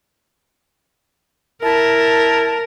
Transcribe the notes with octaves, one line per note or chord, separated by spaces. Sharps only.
E4 A#4 A5